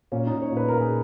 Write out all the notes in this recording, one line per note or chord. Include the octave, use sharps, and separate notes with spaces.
A#2 C#4
D#4
A#2
C#5
A#2
B4
A#2 A#4
G#4